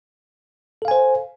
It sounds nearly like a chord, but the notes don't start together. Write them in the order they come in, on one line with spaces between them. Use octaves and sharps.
A4 F5 G#5 C5